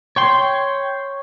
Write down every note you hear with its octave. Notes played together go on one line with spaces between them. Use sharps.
C#5 G5 C6